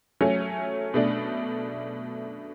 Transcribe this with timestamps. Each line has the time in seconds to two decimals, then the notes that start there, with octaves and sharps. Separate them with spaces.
0.21 F#3 A3 C#4
0.94 B2 A3 D4